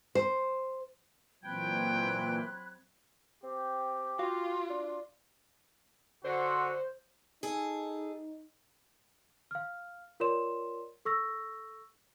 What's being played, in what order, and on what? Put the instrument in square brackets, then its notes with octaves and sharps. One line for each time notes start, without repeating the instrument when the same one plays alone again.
[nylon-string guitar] C5
[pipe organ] A#2 E3 [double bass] F#3 C4 [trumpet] G5 [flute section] B5 F#6 G#6
[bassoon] C4 [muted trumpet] G4
[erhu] F4 [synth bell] F#4 F5
[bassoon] D4
[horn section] F#2 D3 [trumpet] F#4 [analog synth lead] C5
[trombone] D#4 [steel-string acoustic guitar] G#4 A4
[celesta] F5 F6
F4 A#4 C#5 D5 C6 E7
A4 C#6 E6 A#6